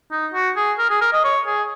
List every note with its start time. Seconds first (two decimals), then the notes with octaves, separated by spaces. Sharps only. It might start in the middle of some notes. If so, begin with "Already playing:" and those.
0.11 D#4
0.34 F#4
0.57 G#4
0.79 A#4
0.90 G#4
1.01 A#4
1.13 D#5
1.24 C#5
1.47 G#4